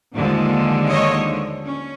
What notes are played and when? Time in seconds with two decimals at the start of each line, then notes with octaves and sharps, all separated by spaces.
0.14 D#2 D3 F3 G#3
0.90 C#5 D#5
1.66 C#4